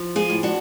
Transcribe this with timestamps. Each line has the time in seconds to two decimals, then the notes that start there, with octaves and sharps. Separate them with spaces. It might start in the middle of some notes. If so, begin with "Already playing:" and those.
Already playing: F3
0.16 F4 G#4
0.30 A2
0.43 D4 F#4